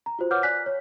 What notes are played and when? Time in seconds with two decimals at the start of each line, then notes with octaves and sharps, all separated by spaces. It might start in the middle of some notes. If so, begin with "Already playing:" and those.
0.06 A#5
0.19 F4 F#4 C5
0.31 B4 C#5 F#5 D6 F6 G6
0.43 D5 G#5 F#6 B6
0.66 C#5